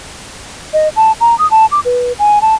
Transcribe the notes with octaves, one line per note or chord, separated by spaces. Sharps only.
D#5
A5
A#5
D#6
A5
D6
B4
G#5
A5